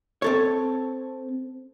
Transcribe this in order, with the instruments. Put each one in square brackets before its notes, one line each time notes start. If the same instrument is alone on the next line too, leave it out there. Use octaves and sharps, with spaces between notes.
[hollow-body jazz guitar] C4 A4 C#5